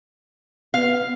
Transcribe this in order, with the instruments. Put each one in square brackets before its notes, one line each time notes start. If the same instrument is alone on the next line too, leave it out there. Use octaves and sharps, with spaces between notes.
[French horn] B3 [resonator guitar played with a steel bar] F5